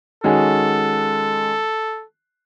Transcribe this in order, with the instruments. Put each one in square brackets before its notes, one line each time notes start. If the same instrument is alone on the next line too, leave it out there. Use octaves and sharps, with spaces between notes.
[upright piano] D#3 G#3 C#4 F#4 [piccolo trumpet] A4